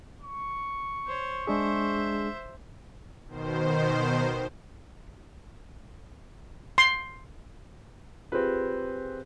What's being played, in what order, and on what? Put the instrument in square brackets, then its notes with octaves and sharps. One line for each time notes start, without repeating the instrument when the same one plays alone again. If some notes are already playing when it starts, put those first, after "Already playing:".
[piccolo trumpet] C#6
[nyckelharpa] C5 C#5
[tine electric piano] G#3 D4 G#4 [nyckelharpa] C5 E5
[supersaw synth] B2 D#3 C5
[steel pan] C6
[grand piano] C4 B4 [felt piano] F4 G4 G#4